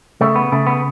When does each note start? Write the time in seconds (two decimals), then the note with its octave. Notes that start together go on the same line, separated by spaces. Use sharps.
0.21 C#3 A3
0.36 B3
0.52 C#3 A3
0.67 B3